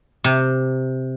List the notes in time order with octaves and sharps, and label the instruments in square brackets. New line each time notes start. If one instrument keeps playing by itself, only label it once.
[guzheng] C3